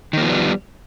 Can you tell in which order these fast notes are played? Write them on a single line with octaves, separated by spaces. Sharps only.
D#3 A#3 F3 B3 G3